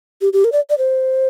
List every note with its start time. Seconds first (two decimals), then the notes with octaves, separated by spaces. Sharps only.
0.21 G4
0.33 G4
0.44 A#4
0.52 D5
0.70 D5
0.78 C5